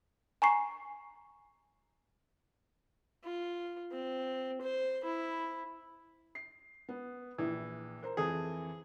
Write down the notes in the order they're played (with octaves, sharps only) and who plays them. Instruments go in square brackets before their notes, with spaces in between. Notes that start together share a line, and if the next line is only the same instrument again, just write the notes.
[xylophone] G#5 A#5 C#6 C7
[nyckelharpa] F4
C4
C5
E4
[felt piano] C7
B3
[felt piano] A#1 [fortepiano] E3
[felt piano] A#4 C5 A#5
[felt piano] F2 E3 A4 [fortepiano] G#4